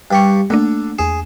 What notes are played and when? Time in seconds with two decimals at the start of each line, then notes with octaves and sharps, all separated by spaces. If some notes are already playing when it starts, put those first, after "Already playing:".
0.11 G2 G4 C#6
0.50 D3 A3 A#3 D4
0.99 E2 G#4 E7